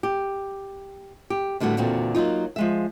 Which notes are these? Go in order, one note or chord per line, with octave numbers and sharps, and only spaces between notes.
G4
G4
A2 D3 G3 B3 F#4
E2 A#2 D3 C4 F#4
F#3 A#3 D#4 F4
F3 G#3 E5